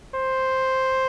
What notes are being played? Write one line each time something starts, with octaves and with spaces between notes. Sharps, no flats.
C5